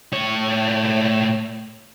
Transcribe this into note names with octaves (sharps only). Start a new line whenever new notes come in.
A2 C#5